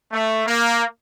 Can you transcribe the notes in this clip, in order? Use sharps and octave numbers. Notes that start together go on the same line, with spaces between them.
A3
A#3